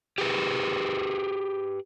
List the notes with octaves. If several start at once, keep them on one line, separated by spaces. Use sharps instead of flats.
G4 G#4 B4